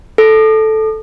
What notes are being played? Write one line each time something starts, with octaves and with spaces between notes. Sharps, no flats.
A4